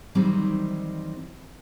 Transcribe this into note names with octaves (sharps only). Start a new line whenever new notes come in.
D#3 E3 F#3 G3 C4 D#4